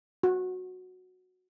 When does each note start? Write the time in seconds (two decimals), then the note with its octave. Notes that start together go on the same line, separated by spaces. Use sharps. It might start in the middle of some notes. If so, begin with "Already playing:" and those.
0.23 F#4